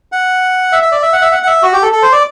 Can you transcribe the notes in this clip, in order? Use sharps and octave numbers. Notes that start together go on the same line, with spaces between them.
F#5
E5
E5
D5
E5
F#5
E5
F#5
F#5
E5
F#4
G4
A4
A4
C5
D5